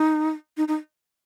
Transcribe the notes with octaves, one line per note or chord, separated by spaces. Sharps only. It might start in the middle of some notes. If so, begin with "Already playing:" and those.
Already playing: D#4
D#4
D#4